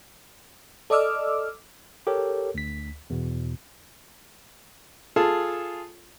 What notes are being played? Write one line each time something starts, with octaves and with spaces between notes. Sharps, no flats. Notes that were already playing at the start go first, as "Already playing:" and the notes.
A4 D5 D#5 D6 E6 F6
G4 A4 A#4 C#5
D2 B6
E2 B2
F4 G#4 A4 A5